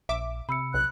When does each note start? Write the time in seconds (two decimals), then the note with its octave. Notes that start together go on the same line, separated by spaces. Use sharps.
0.09 A#1 E5 D6
0.49 C3 B5 E6 C#7
0.74 B1 F#6